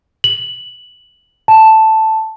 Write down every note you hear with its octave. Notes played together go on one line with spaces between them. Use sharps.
F#7
A5